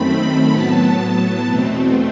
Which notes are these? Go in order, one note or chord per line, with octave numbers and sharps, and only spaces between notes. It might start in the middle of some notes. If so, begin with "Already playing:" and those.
Already playing: F#2 D#3 A3 C4 B5
A2 F#3 B3 A5
E2 B2 A3 C4